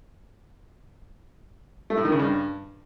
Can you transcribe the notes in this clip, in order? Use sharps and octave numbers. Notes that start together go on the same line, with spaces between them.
A3
A2
D#3
C#3
G2